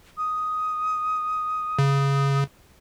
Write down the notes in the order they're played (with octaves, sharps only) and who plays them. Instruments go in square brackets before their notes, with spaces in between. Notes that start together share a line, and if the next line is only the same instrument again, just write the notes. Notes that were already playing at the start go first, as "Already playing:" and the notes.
[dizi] D#6
[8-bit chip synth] C#3